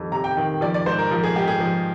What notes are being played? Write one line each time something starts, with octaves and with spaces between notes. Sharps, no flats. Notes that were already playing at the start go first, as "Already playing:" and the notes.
Already playing: F2 D#3 G3
C3 A#5
G5
D#3
F3 D5
D5
G#2 C5
A#4
F3
G#4
G#2 G4
G#4
F3